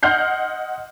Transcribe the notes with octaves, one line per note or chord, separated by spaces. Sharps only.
D#5 F#5 C6 F6 G6 C7